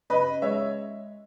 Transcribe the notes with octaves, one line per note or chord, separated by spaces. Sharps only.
C#3 B4 D#5
G#3 C#5 E5